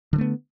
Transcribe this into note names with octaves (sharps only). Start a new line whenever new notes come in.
D3 E3 A3 B3